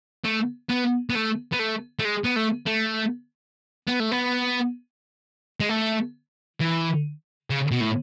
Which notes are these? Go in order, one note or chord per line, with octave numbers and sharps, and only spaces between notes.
A3
B3
B3
A3
B3
A3
A3
G#3
B3
A3
A3
B3
A3
B3
G#3
A3
E3
C#3
B2
A2